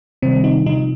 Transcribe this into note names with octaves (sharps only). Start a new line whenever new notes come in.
C3 D#3 G3 C4
D#4
C3 F3 D#4